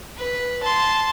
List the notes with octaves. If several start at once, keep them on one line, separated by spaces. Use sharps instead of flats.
B4
A5 C6